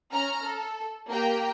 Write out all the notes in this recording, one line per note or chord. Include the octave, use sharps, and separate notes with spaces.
C#4 A#5 F6
A4
A#3 G4 G5 A#5